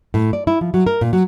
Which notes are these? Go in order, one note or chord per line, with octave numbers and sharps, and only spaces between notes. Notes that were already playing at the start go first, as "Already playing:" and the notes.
A2
D5
E4
F3
F#3
A#4
A#2
F#3